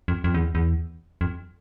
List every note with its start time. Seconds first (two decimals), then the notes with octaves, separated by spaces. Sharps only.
0.08 F2
0.24 F2
0.34 E2
0.55 E2
1.21 F2